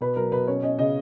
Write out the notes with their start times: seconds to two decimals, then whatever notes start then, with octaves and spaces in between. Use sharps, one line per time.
0.01 B2 B4
0.16 F#3 A#4
0.32 B2 B4
0.48 C#4 C#5
0.63 C#4 D#5
0.79 C#3 D#5